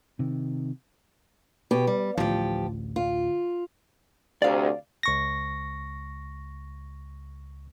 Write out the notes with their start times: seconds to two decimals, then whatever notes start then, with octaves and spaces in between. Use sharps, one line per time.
0.19 C3 D#3
1.71 B2 G4
1.87 G3
2.17 A1 D2 F3 G4
2.96 F4
4.42 D2 C3 D5 F5
5.03 C#2 C#6 A#6